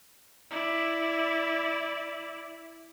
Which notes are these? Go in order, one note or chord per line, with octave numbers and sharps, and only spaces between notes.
E4 D5